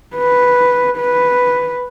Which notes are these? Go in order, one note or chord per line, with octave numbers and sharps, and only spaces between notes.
B4
B4